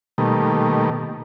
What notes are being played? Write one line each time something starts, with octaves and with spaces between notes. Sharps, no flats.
B2 D#3 G3 A3 A#3